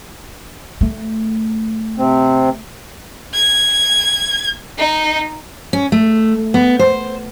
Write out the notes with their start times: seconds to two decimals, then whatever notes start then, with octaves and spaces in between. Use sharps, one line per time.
0.81 A3
1.98 C3 C4
3.34 G#6
4.78 D#4
5.73 C#4
5.92 A3
6.54 B3
6.79 C5